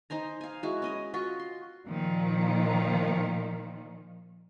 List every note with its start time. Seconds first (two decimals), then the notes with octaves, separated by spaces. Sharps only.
0.10 D#4 C5 G#5 A#5
0.41 F5 G#5
0.63 G#3 E4 F#4
0.82 C#4 D#5 G#5
1.14 F4 F#4 C#6
1.39 C6
1.87 A#2 D#3 F3